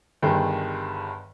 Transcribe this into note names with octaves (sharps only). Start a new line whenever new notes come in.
G1 G2 D#3 G#4 G5